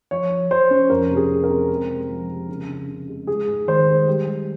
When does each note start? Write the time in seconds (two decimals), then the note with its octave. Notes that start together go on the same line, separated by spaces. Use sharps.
0.11 F3 C#5
0.31 F3
0.50 F3 C5
0.71 C#4
0.90 F2 A#4
1.10 C3
1.17 G#4
1.30 C4
1.44 A#4
1.49 C4
1.69 G#3
1.90 C3
2.09 F3
2.29 C3
2.49 C#3
2.69 C#3
2.88 C#3
3.08 G#3
3.27 G#2 G#4
3.47 G#2
3.68 D#3 C5
3.87 G#3
4.07 G3
4.27 G3